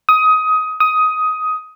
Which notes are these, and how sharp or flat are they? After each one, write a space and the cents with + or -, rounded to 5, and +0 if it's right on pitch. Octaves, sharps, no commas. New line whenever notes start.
D#6 +20
D#6 +15